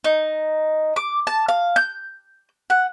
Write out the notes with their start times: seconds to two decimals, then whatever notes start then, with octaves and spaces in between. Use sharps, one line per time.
0.04 D#4
0.96 D6
1.27 A5
1.48 F5
1.76 G6
2.70 F#5